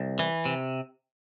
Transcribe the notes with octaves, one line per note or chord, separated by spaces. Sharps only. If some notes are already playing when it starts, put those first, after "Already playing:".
Already playing: C2
E3
C3